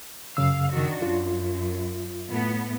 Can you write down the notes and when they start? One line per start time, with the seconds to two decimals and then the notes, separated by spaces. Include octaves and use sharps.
0.37 F#2 C#3 F5 E6
0.73 D#3 D4 F#4
1.02 F#2 F4
2.30 A2 B3